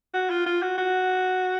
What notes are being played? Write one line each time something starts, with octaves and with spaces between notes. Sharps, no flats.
F#4
F4
F4
F#4
F#4